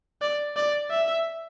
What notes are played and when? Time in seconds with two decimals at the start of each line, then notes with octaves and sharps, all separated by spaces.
0.22 D5
0.56 D5
0.91 E5